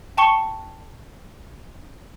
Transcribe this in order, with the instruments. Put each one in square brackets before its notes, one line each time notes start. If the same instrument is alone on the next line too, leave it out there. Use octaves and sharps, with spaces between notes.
[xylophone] G5 A5 C#6 C#7 G7